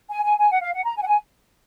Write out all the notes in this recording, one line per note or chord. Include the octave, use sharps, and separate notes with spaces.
G#5
G#5
G#5
F#5
F5
F#5
A#5
G#5
F#5
G#5